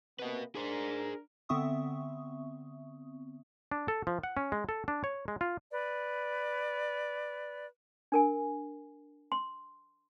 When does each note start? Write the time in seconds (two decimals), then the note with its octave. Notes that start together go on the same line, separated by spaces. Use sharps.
0.19 C3 A#3 B3 B4 D#5
0.55 D4 G#4 A#4 C5
1.49 D3 B3 C4 E5 C#6 D#6
3.71 D4
3.88 A4
4.07 F3
4.23 F#5
4.37 C#4
4.52 G#3
4.69 A4
4.88 D4
5.04 C#5
5.28 G#3
5.41 F4
5.71 B4 D5
8.12 D4 A#4 G#5
9.32 C6